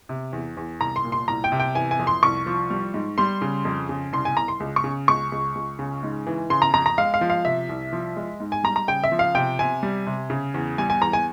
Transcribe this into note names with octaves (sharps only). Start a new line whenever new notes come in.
C3
E2
E2
C2 A#5
C6
A#2
C6
C2 A#5
G5
C3
G5
E3 G#5
G#5
F2
C6
C2 C#6
F3
G3
G#2
G3 C6
C#3
F2
C#3
C2 C6
G#5
C2 A#5
C6
C#2
C#6
C#3
C#2 C#6
C#2
C#2
C#3
G#2
E3
C#3 C6
A#5
F2 A#5
A#5
G#3 F5
F5
F3
F5
C3 E5
C2
F3
G#3
G#2
G#5
G3 A#5
A#5
C#3 G5
E5
F3
F5
C3 G5
C3 G#5
G3
C3
C#3
E2
G3 G#5
G#5
E2 A#5
G#5